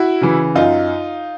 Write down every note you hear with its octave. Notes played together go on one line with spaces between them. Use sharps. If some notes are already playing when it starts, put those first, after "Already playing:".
Already playing: E4 F#4
C#3 E3
F#2 D#4 F4